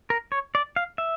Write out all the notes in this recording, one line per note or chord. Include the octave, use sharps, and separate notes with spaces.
A#4
C#5
D5
F5
E5